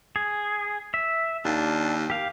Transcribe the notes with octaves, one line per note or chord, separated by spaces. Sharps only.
G#4
E5
D#2 D4
G4 F5